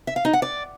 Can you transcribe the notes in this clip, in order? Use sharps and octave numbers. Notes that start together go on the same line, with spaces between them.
E5
F5
D#4
F#5
D5